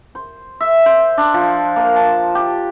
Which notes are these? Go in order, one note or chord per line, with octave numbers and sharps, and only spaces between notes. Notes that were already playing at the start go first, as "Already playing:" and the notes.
C5
E5
C5
D4
F3
A#3
A5
G4